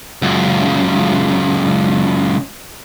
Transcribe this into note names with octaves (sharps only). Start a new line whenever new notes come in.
C#2 F#2